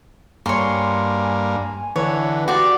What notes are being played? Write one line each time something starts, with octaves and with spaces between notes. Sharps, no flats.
G2 A#3 C#5 G#5 C6
D3 E3 B4 C#5
F#4 G4 D5 C6